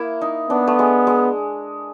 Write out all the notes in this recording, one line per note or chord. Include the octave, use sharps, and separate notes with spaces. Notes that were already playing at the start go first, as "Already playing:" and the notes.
Already playing: A#3 E4
D#4
B3 D4
A3
G#3
G#3